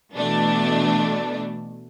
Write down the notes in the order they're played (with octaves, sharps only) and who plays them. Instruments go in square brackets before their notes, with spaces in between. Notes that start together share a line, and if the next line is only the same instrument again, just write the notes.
[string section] B2 E3 A3 D4